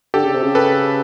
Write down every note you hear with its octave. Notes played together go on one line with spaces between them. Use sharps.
D3 G4 A4
C#3
C3
C#3
A4 B4